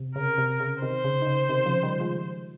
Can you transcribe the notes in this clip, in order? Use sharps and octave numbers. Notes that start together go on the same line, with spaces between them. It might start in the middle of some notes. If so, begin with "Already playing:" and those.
Already playing: C3
C#3 A#4
C3
C#3
C3 D#3 C5
C#3
D#3
C#3
C3 D#3
C#3 F3
D#3 G3
F3 G#3